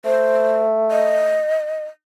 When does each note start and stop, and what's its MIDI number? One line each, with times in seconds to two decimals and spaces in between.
0.05 1.44 57
0.05 0.61 72
0.91 1.85 75